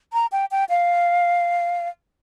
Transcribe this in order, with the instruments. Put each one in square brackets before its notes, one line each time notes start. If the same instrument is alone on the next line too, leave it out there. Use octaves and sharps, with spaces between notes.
[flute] A#5
G5
G5
F5